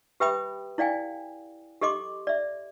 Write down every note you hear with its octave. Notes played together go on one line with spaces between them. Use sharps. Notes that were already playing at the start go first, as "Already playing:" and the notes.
G4 B4 E5 G5 B5 D#6
E4 D5 F5 G5 G#5
G4 A4 D#5 C6 D6
D5 E5